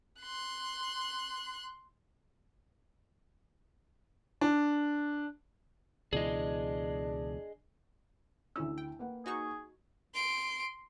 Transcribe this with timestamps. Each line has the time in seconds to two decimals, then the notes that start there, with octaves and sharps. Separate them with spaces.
0.21 C6 F#6
4.41 D4
6.13 C#2 B2 E3 D4 G#4 D#5
8.56 D2 C#4 E4 E6
8.78 G5
8.99 A#3 B4 F#5
9.26 D#4 F#4 G#4 C#6
10.14 C6 D7